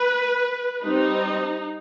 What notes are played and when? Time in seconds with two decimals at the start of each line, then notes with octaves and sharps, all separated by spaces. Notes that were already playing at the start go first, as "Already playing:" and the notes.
Already playing: B4
0.83 G3 C4 D#4